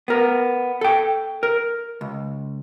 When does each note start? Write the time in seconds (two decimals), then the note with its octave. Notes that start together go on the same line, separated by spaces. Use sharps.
0.08 B3 A#4
0.81 A4 G5
1.43 A#4
2.01 C#2